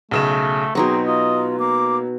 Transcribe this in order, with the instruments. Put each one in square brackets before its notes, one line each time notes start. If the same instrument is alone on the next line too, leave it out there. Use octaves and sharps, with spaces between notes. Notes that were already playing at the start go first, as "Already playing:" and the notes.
[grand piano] B1 C#3 E7 [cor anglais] A3
[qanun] B2 D#4 C#6 [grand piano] F#3 [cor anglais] C4 [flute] G#4
[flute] F4 [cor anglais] D#5
[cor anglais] A#3 [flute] D6